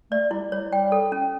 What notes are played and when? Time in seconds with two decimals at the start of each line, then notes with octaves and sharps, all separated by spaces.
0.11 A3 D5
0.31 G3 E4
0.52 G3 C#5
0.71 G3 G5
0.92 A4
1.12 C#4